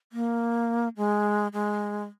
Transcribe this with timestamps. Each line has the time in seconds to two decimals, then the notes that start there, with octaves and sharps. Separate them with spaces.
0.13 A#3
0.97 G#3
1.53 G#3